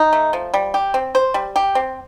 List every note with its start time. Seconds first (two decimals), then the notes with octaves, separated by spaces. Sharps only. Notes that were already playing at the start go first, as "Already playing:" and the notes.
Already playing: D#4
0.13 A3
0.33 F3
0.54 G3
0.74 G4
0.94 C4
1.15 C5
1.34 G3
1.56 G4
1.75 C4